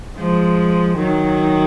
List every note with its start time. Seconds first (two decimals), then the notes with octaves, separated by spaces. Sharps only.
0.18 F3 G#3
0.98 D#3 F#3